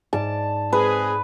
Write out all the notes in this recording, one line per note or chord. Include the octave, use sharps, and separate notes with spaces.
G#2 D5 A5 D7
G#3 C4 G#4 B4